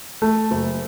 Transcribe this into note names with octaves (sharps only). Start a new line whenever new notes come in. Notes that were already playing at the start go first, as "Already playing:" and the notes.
A3
F#1